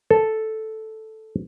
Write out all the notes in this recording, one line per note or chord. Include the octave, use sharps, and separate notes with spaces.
A4